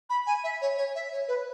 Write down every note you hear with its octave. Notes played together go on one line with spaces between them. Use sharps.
B5
G#5
E5
C#5
C#5
E5
C#5
B4